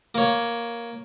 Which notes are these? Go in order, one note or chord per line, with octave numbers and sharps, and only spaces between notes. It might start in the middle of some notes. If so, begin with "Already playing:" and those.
A#3 C#5